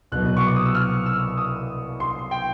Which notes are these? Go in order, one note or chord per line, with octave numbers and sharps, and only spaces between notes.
C2 B2 F#3 F#6
C#6
D6
D#6
E6
F6
E6
D#6
C6
G5